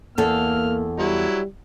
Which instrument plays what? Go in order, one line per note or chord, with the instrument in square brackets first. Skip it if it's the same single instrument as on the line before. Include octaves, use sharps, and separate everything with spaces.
[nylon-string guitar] E2 A4 [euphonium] A#3 [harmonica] F6
[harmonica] F#3 E4 [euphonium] G3